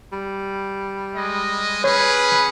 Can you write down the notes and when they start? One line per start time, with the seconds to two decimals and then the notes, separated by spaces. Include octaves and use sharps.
0.12 G3
1.14 G#3 D#5
1.84 C#4 G#4 B4 C#5